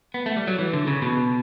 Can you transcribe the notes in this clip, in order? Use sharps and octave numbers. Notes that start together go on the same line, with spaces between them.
B3
A3
G3
F#3
E3
D3
C#3
B2